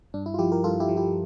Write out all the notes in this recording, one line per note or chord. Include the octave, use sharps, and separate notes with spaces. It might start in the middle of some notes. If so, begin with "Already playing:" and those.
G2 D4
E4
F4
F3 E4 G4
G4 A#4
G2 F4 A4
E4 G4
F3
E4 G4